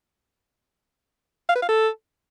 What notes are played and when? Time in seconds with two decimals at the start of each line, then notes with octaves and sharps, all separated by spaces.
1.49 F5
1.55 B4
1.62 F5
1.69 A4